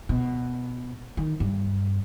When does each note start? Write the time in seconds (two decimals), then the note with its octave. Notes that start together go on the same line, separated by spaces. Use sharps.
0.09 B2
1.17 D#3
1.40 G2